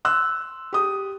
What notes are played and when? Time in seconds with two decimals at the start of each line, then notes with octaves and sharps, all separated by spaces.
0.05 C6 E6 F#6
0.73 G4 D#6